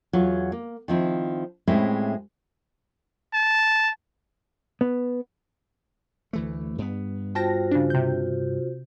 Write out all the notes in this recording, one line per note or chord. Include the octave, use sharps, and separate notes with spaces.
E2 F#3 F4 C#5
A#3
D#3 F3 C4 E4
A2 G3 G#3 C4 C#4 E4
A5
B3
D2 E3 A3
G2 B3
F4 F#4 C5 G5 A5 A#6
C#3 D4
C3 G6